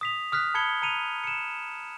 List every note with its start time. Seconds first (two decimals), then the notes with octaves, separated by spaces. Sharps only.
0.01 D#6 B6 F7
0.32 D#6 F6 F#6 B6
0.54 A5 B5 G#6 C#7 G7
0.82 A#5 C#7 D#7 F7
1.24 C#7 E7